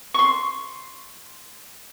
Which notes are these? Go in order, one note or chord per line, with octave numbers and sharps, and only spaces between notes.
C6 C#6